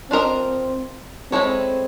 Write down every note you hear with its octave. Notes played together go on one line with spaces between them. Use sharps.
C4 D4 F4 A#4 D#5
G#3 C4 C#4 E4 A4 C#5